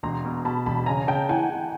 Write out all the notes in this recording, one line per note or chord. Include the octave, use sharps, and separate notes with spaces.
E1 A#5 C6
B2
B2 A5 B5
E1 A5 B5
C#3 G#5 A#5
C#3 G5 A5
E3 F#5 G#5
E3